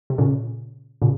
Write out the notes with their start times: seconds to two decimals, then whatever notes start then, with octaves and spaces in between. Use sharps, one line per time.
0.10 C3
0.18 A#2 C#3
1.02 A#2 C#3